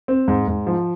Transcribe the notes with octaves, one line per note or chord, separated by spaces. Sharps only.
C4
G#2
G#2
F3